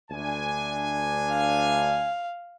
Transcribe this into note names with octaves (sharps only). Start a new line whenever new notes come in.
D2 D4 G#5
F5